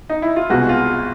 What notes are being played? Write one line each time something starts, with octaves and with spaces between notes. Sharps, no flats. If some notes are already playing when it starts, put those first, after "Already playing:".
D#4
E4
F4
C2 B2 G#3 F#4
F4